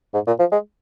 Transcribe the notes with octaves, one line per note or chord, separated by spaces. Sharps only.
G#2
A#2
F3
G#3